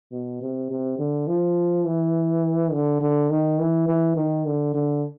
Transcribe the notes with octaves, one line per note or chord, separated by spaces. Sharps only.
B2
C3
C3
D3
F3
E3
D3
D3
D#3
E3
E3
D#3
D3
D3